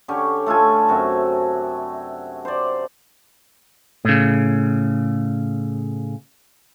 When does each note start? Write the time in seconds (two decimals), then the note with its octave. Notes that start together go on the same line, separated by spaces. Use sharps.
0.08 D3 C#4 G4 C#5
0.46 A3 F4 A4 G#5
0.88 F#2 C3 F#4
2.45 C5 D5
4.05 A2 C#3